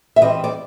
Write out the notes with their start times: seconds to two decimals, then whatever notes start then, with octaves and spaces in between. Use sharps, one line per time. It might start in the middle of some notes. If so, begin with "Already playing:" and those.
0.16 E5
0.21 E3 G3 C4 D#5
0.44 D5